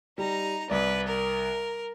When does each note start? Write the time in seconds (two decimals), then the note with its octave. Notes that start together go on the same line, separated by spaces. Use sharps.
0.18 G3 D#4 A#5
0.70 C2 B4 D5
1.08 A#4